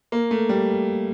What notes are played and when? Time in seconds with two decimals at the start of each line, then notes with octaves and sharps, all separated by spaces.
0.12 A#3
0.31 A3
0.49 G3